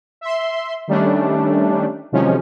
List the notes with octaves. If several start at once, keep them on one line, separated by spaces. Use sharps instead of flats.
E5 C6
D#3 G3 A3 C#4 D4
C3 D#3 F3 F#3 G#3 C#4